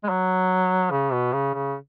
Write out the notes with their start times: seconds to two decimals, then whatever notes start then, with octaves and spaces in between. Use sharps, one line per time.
0.04 G#3
0.09 F#3
0.91 C#3
1.12 B2
1.33 C#3
1.54 C#3